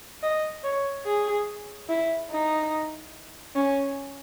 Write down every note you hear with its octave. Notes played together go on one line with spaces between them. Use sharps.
D#5
C#5
G#4
E4
D#4
C#4